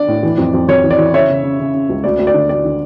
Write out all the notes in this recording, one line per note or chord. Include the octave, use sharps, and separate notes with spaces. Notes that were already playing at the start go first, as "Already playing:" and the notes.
Already playing: D4 D5
A2
E3
F2
F2
F2 C#5
E3
D5
E3
C#3 C#5 E5
C#3
C#3
C#3
C#3
C#2
D2 D5
D2
D5
D3
D2 D5
D3